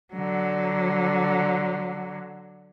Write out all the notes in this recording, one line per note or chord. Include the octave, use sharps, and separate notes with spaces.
D3 F#3